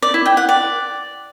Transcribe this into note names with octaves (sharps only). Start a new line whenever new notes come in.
D5
E4
G5
F#5
D5